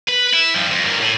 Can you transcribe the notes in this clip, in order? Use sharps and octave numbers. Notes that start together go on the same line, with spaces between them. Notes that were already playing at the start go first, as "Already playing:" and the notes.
B4
E4
G2 F3
F2
G2 A#3
A2